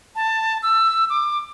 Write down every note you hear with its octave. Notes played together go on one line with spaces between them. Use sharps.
A5
E6
D6